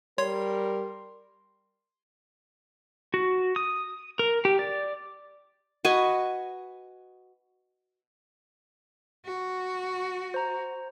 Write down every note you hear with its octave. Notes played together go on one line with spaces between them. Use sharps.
G3 A#4 C#5 C6
F#4
D#6
A#4
G4
D5
F#4 B4 D#5 G#5
F#4
C5 A#5